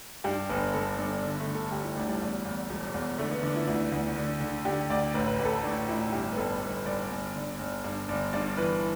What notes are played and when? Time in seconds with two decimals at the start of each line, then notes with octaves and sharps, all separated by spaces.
0.24 G2 G4
0.49 G1 B4
0.74 G1 A4
0.98 G1 D4
1.22 D3
1.40 A3
1.48 D3
1.55 A4
1.71 D2 G4
1.84 E4
1.96 D2 D4
2.08 G3
2.21 E2
2.45 E2
2.69 E1
2.94 E2
3.18 D3 A3
3.31 B3
3.43 D3 D4
3.56 E4
3.67 D2 E4
3.92 D2
4.16 D3
4.41 D3
4.65 D3 G4
4.90 D2 D5
5.14 A1 B4
5.27 B4
5.39 A1 B4
5.45 A4
5.52 B4
5.63 A2 D4
5.89 A1 E4
6.12 G1 G4
6.33 B4
6.37 G1 A4
6.62 G1 B4
6.86 G1 D5
7.11 G1
7.36 D3
7.59 G1
7.84 G2
8.08 G1 D5
8.33 G2 D5
8.57 E3 B4